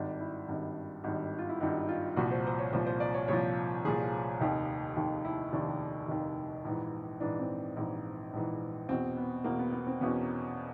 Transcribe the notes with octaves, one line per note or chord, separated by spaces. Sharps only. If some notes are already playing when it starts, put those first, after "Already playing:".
Already playing: G#1 G2 D#3 D4
E4
G#1 G2 D#3
G#1 G2 D#3
F4
E4
G#1 G2 D#3 D#4
F4
C2 A#2 F3 F#4
C5
C5
C#5
C2 A#2 F3 C5
C5
D5
C#5
C2 A#2 F3 C#5
C2 A#2 F3 G#4
F1 D#2 D#3
F1 D#2 D#3
E4
F1 D#2 D#3 D4
F1 D#2 D#3
A#1 G#2 E3
A#1 G#2 E3 D4
C4
A#1 G#2 E3
A#1 G#2 E3
E2 B2 C4
B3
E2 B2 A#3
B3
B3
C4
E2 B2 C#4